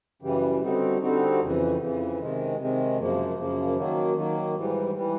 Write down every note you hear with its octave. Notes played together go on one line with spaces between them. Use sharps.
F#2 C#3 E3 G3
D3 G3 C4 D#4 F#4
D3 G3 C4 D#4 F#4
F2 C#3 E3
F2 C#3 E3
C3 D#3 G#3
C3 D#3 G#3
F#2 C#3 F3 A#3
F#2 C#3 F3 A#3
D#3 F#3 A#3
D#3 F#3 A#3
G#2 E3 G3
E3 G3